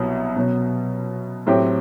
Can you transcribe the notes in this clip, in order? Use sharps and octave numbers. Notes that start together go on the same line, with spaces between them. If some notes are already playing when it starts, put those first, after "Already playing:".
Already playing: C2 B2 F#3 B3
B2 F#3 B3
A2 F#3 C4 G4